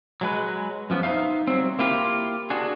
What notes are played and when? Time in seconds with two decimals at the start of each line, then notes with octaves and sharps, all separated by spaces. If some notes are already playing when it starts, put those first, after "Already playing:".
0.21 F#3 G#3 B4
0.90 F#2 F3 B3 F#4
1.03 D#4 F4 C5 E5 F5
1.47 F#3 G3 C4
1.79 A#3 E4 F4 G4 A#4
2.50 D4 F#4 G#4